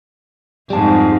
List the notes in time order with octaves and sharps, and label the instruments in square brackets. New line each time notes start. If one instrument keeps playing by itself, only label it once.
[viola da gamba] F2 G#2 [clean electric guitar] G3 A5